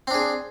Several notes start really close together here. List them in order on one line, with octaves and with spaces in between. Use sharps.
C4 D4 G#4